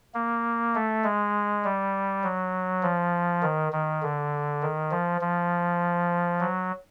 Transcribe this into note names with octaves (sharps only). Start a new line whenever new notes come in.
A#3
A3
G#3
G3
F#3
F3
D#3
D#3
D3
D#3
F3
F3
F#3